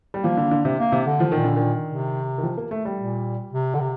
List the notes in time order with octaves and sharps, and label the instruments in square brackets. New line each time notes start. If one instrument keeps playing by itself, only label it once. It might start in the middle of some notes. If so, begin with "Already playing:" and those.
[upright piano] G3
[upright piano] F3 [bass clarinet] A#3
[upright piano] D3
D3
C3
[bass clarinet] A#3
[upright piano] C3
[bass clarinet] D3
[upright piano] F3
[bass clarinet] A#2 [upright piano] D#3
[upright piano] D3
D#3
[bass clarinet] C3
[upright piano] D#3
F3
A#3
A3
G3
[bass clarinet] A#2
C3
D3
C3